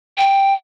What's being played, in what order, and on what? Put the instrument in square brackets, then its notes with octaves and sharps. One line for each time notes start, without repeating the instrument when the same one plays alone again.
[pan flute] G5